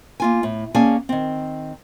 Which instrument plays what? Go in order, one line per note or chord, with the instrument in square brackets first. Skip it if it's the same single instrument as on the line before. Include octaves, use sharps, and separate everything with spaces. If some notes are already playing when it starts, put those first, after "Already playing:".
[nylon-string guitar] A#3 F4 G#5
A2
A#3 C#4 G#4 D5 G#5 A5
D#3 C4